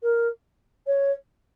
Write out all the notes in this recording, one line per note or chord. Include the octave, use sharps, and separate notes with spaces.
A#4
C#5